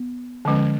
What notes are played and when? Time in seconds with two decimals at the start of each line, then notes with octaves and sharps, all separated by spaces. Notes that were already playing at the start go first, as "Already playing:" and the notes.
Already playing: B3
0.45 D3 F3 G#3 C#4